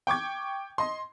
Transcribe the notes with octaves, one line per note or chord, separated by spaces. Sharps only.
G5 C#6 D6 G#6
D#5 C6